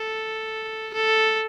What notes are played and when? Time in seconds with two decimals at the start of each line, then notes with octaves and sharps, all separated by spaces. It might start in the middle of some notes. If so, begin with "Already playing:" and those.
Already playing: A4
0.94 A4